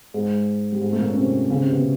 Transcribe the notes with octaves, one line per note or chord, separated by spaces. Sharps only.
G#2 G#3
G3
G#2 G#3
A3
A#2 A#3
C#4
C3 C4
C#3 C#4
C3 C4
B2 B3